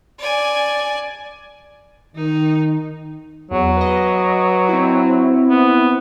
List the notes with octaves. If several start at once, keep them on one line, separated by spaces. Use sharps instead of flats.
D5 G#5
D#3 D#4
E2 F#3
B4 D#5
C4 E4
B3